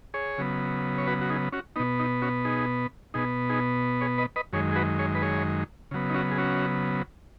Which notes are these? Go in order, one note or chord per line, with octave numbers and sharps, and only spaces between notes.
G#4 C#5
C#3 F#3 B3
C#5
F#4 B4
F#4
D#4 G#4
C#4 F#4
B2 B3 D#4
D#4
C#4 F#4
D#4 G#4
B2 B3 D#4 G#4
D#4 G#4
G#4 C#5
B4 D#5
B4 D#5
F#2 D#3 G#3 G#4 C#5
G#4
F#4 B4
G#4 C#5
B4
G#4 C#5
C#3 F#3 B3
D#4
C#4 F#4
G#4
C#4 F#4